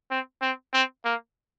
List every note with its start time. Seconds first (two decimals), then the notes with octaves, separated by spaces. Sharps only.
0.10 C4
0.42 C4
0.73 C4
1.05 A#3